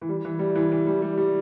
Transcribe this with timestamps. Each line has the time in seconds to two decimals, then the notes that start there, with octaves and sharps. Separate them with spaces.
0.02 E3
0.09 G3
0.25 E3
0.39 G3
0.55 E3
0.71 E3
0.86 G3
1.02 G3
1.18 G3